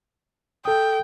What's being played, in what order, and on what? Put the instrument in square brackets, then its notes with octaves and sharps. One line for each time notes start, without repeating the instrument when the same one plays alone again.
[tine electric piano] A4 D#6 [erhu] G5